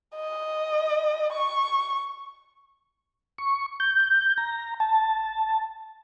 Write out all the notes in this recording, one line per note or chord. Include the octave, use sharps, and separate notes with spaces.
D#5
C#6
C#6
G6
A#5
A5